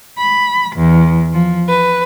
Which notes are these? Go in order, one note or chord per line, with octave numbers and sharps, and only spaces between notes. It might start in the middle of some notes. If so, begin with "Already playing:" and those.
B5
E2
F3
B4